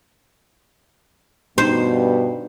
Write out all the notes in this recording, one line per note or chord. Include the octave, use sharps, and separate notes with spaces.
G2 B2 D4 D#4 G4 C5